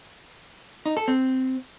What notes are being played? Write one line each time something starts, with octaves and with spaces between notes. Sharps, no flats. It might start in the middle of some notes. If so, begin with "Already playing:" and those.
D#4
A4
C4